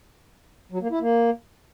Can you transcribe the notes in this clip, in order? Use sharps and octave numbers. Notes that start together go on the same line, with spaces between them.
F#3
A#3
E4
A#3